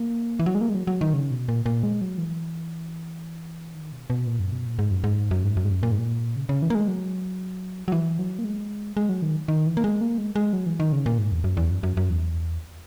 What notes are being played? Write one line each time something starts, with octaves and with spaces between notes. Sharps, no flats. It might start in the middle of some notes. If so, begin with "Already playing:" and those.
Already playing: A#3
E3
F#3
G#3
A#3
G#3
F#3
F#3
D#3
C#3
B2
A#2
A#2
G#3
F#3
E3
D#3
B2
B2
A#2
F#2
B2
A#2
G#2
F#2
G#2
F#2
G#2
F#2
G#2
F#2
A#2
G#2
A#2
C#3
C#3
E3
A#3
G#3
F#3
F#3
E3
F#3
A#3
G#3
G#3
F#3
D#3
D#3
E3
A#3
G#3
A#3
G#3
G#3
F#3
E3
D#3
C#3
A#2
G#2
E2
F#2
E2
F#2
F#2
F#2
E2